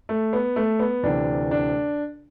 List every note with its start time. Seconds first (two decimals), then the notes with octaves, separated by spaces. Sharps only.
0.09 A3
0.33 B3
0.56 A3
0.79 B3
1.03 D2 C3 E3 D4
1.51 D4